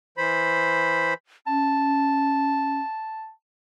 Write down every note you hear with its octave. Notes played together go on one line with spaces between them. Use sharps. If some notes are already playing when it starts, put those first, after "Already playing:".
E3 C5 B5
C#4 A5